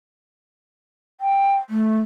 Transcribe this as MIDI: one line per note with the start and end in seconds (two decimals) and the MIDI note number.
1.21 1.56 79
1.70 1.98 57